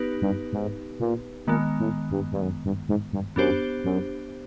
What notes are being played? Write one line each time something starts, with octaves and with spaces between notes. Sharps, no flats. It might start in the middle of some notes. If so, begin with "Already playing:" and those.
Already playing: B3 D#4 G4 B4
G2
G#2
A#2
A#2 D#3 G#3 B3
A2
G2
G2
F#2
G2
G#2
G2
F#2 B3 D4 G4 C5
F#2